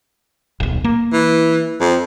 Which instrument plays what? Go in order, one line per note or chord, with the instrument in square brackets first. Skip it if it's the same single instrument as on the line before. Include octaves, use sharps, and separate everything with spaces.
[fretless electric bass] D#1 B1
A#3
[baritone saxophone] E3
F2